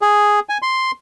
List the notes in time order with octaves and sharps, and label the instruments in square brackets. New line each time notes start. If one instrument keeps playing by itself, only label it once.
[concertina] G#4
G#5
C6